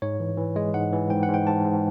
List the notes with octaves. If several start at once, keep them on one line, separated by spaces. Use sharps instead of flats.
G#2 C#5
E3
E3
G#3
G#2 F#5
E3
G#2 G5
F#5
G#2
G5
G#2 A5
G#2